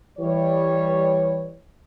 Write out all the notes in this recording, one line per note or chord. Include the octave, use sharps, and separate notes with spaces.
E3 G3 C#5